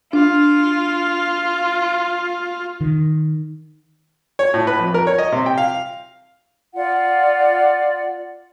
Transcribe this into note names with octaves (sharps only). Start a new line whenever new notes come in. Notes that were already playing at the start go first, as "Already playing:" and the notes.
D4 F4
D#3
C#5
A2
B4
F2
A#4
C#5
D#5
C3
G5
F5
F4 D5 F#5